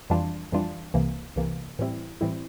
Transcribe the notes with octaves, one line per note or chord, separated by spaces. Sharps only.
F2 E3 G3 D4 F4
F2 E3 G3 D4 F4
C2 C3 E3 A#3
C2 C3 E3 A#3
A2 E3 G3 C4 E4
A2 E3 G3 C4 E4